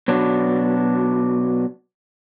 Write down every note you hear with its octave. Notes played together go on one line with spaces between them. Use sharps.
B2 F#3 D4